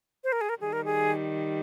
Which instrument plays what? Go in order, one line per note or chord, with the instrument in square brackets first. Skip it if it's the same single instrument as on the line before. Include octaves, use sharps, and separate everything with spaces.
[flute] C5
A#4
G#4
A#4
[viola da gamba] D#3 G3 [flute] G#4
[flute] A#4
G#4